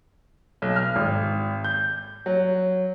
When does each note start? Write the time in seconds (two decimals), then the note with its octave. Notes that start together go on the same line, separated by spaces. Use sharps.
0.62 B1
0.76 F6
0.96 G#1
1.64 G6
2.26 F#3